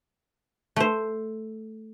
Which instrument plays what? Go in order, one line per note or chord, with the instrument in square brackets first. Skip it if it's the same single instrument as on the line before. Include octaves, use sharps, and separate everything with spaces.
[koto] A3 C5